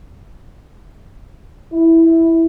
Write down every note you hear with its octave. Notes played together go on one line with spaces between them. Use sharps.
E4